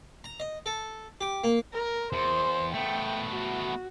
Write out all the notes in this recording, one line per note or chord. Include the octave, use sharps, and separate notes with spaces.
A#5
D#5
A4
G4
A#3
A#4
E2 C5
A3 B3 G5
F#4